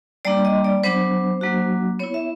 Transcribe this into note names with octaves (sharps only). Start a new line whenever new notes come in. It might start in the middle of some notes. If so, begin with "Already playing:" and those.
G3 A#3 D4 D5
D#5
D5
F#3 B3 D4 C5
F#3 A#3 D4 F#4
B3 E4 C#5
E5